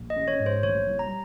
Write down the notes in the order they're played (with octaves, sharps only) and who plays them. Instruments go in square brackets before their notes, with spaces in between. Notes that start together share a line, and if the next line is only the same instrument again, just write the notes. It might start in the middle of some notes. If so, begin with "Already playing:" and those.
Already playing: [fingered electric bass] A#1
[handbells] D#5
[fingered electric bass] C#4
[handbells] C#5
[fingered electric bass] G#2
[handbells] C5
[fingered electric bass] A#1 [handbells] C#5
[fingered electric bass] G3
[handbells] A#5